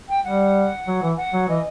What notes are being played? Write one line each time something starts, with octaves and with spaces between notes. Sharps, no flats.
G5
G3 F#5
F#3
E3
F#5
F#3
E3 D#5